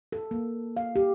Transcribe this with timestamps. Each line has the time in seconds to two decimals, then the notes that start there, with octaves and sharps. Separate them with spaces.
0.12 A4
0.31 A#3
0.77 F5
0.96 G4